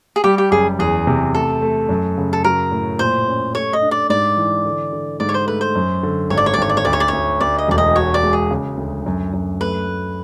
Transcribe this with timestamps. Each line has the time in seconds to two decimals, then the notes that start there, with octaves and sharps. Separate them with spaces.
0.16 G#4
0.24 G3 G4
0.38 G4
0.52 F#1 G#4
0.79 E2 G#4
1.07 C3
1.34 A3 A4
1.62 A3
1.89 F#2
2.18 C#3
2.33 A4
2.44 F#3 A#4
2.72 A2
2.99 A#2 C5
3.27 C#4
3.54 A3 C#5
3.73 D#5
3.82 D4
3.91 D5
4.10 G#2 D5
4.37 E3
4.65 D3
4.93 D3
5.20 G#2 D5
5.29 C#5
5.34 C5
5.47 A3 B4
5.61 C5
5.75 F#2
6.03 D3
6.30 G#1 C#5
6.37 D5
6.46 C#5
6.54 D5
6.58 G#1 C#5
6.69 D5
6.77 C#5
6.85 D2 D5
6.93 C#5
7.00 D5
7.08 D2 C#5
7.41 D2 D5
7.58 D#5
7.68 E1 D5
7.78 D#5
7.95 F#4 C#5
8.14 D5
8.23 G#3
8.33 G#4
8.51 C#3
8.78 D2
9.06 F#2
9.33 F#2
9.61 A3 B4
9.88 A3